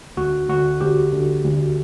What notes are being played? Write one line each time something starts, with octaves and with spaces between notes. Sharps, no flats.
D2 F#4
D2 F#4
D2 G4
D3
D2